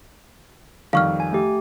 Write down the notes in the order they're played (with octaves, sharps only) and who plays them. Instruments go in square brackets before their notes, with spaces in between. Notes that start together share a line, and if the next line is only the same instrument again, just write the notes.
[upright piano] F2 D#3 G3 [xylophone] F5 C#6 F6
[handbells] G#5
A3 G4